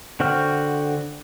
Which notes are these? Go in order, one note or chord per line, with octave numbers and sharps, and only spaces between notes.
D3 F#4 C5 G5 F6